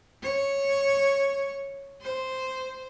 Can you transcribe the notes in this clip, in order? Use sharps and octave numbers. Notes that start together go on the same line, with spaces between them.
C#5
C5